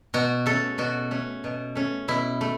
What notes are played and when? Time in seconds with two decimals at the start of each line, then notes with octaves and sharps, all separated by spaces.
0.14 B2 F#4
0.46 A3 C#4 A4
0.78 B2 F#4
1.11 A3 C#4
1.44 B2
1.75 A3 C#4
2.08 B2 E4
2.41 A3